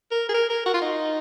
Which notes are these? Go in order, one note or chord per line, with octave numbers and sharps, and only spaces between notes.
A#4
G#4
A#4
A#4
F#4
F4
D#4